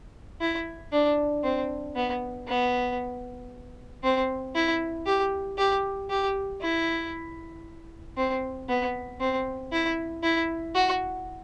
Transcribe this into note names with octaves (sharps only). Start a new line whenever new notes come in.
E4
D4
C4
B3
B3
C4
E4
G4
G4
G4
E4
C4
B3
C4
E4
E4
F#4